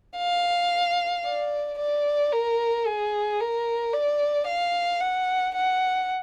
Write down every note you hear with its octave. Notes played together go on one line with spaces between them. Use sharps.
F5
D5
D5
A#4
G#4
A#4
D5
F5
F#5
F#5